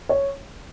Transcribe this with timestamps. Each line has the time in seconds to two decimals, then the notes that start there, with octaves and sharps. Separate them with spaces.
0.09 C#5